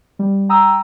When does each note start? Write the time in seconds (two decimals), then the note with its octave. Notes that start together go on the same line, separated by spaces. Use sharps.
0.19 G3
0.49 G5 A#5 D#6 E6